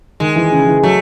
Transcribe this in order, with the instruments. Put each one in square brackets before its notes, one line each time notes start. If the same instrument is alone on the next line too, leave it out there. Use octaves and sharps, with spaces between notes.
[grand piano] D#3 [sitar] G#3
[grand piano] E3
C#3
E3
[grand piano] F#3 [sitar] A3